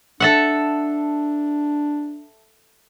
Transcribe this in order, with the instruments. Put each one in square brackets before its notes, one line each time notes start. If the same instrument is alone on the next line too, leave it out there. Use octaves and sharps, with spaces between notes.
[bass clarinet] D4 [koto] A4 E5 F#5